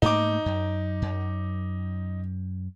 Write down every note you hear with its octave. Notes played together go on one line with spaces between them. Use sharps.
G#2 A3 A#3 D#4 D6
F#2
F#2